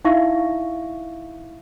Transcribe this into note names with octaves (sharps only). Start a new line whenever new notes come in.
D#4 E4 E5 F5 C#6 A#6